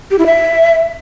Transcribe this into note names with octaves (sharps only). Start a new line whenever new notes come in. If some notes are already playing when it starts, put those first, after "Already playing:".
G4
E4
E5